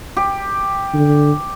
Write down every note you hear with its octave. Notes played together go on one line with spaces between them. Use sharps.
G4
D3